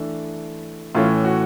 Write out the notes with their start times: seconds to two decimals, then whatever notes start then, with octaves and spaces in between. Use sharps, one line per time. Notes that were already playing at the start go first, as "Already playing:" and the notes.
Already playing: E3 A3 D4
0.95 A2 E3 A3 C#4 F4
1.25 F#4